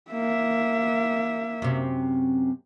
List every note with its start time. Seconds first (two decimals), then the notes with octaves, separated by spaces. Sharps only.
0.11 A#3 E5
1.62 F#2 C3